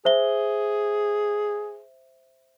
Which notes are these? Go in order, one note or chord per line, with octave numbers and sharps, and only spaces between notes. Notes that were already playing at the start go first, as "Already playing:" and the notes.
G#4 C5 E5 G7